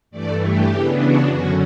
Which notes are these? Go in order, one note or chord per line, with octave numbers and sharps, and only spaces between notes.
G2 E3 A3 D5
G4
C#3 E3 B3 D4
F#4
F#2 D3 F#3 C#4 F#4